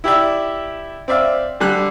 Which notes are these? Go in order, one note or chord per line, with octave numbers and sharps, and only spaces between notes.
E4 G4 D5 E5
C4 D5 E5 F5
D3 G3 F#6